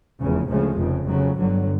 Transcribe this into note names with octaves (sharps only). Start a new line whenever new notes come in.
F1 E2 C#3
D2 C#3 F3 G#3
F1 F2 C#3
F2 C#3 F#3
G1 G2 D3 F#3